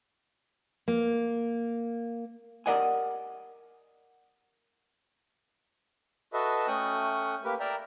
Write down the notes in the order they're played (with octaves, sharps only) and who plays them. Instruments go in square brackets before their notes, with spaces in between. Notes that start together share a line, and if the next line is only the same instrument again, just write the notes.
[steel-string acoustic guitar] A#3
[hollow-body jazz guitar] G4 A#4 D5 D#5 F#5 G#5
[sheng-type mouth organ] F#4 A4 B4 D#5 E5
A3 C#4 G5 C#6 D#6 F#6
A#3 G4 A#4 B4
A#4 D5 E5 G5 A#5